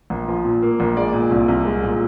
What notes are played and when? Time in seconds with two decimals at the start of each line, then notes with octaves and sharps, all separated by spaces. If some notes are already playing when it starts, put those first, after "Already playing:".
0.10 A#1
0.28 F3
0.45 A#2
0.62 A#3
0.80 A#1
0.97 G#3 D5
1.13 A#2
1.31 C2
1.48 C2
1.65 G#3
1.83 A#2